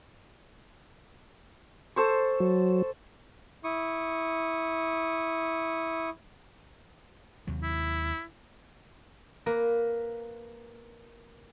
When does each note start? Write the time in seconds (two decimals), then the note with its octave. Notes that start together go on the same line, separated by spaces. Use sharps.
1.96 A4 C5 C#6
2.40 F#3
3.64 E4 C#6 D#6
7.47 D#2 C3 F#3
7.63 E4
9.46 A#3 A#4 B4